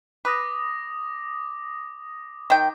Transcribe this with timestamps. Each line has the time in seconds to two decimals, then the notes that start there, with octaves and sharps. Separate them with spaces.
0.25 B4 D6 D#6 A#6
2.50 D#3 G5